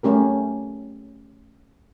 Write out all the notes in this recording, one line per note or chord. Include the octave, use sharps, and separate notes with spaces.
A3 C#4 G4 A#4